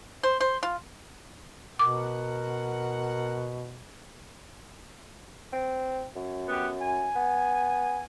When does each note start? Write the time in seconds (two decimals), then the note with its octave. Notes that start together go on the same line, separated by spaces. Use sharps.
0.23 C5
0.40 C5
0.63 F4
1.79 B2 A#4 F#5 D6
5.53 C4
6.16 F#2
6.48 B3 F#4 G4
6.81 G#5
7.16 B3